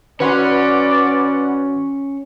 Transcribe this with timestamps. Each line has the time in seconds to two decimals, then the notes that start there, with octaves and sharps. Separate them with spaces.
0.20 D#3 C#4 F#4 B4 D5 F#5 C6